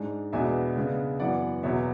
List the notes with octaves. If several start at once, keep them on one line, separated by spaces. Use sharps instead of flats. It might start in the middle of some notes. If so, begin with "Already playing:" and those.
Already playing: G#2 G#3 D4
E2 B2 G#3 B3 D4 E5 G#5
C#3 G#3 B3 D4
F#2 E3 B3 D5 F#5
E2 B2 F#3 B3 C#5 E5